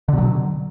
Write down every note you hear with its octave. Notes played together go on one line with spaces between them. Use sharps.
B2 D3 F#3